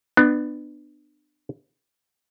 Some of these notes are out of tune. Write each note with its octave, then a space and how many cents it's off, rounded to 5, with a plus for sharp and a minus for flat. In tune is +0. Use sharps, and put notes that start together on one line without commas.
B3 +10 D4 +30